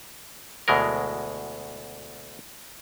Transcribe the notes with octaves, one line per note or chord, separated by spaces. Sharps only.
D2 B2 E3 G#3 A#4